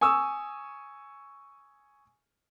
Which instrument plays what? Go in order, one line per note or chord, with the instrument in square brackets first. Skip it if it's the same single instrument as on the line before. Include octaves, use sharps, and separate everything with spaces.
[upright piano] G#5 C#6 D#6 E6